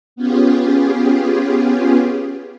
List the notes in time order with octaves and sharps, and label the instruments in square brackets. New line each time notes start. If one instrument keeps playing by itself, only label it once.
[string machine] B3 C#4 F4 G4 G#4